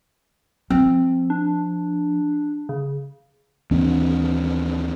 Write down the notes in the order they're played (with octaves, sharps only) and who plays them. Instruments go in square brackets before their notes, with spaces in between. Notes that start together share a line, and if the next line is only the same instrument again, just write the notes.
[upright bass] F3 [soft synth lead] C4
[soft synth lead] D4
C#3
[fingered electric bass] D#2 E3 C4 D4